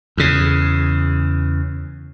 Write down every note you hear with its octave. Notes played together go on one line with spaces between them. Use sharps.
E2 C#3